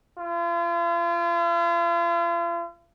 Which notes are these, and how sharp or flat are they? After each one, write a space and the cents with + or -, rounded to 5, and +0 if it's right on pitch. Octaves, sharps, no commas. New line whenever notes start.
F4 -40